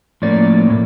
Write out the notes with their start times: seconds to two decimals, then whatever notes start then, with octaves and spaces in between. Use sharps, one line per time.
0.22 A2 F3 A#3 C#4 D5
0.70 A2